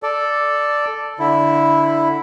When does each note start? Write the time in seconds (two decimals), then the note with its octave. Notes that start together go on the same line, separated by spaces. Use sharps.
0.03 A4 D5
1.20 D3 E4